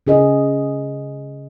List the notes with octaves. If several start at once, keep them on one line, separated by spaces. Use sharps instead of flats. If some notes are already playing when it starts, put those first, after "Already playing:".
C#3 G#4 D#5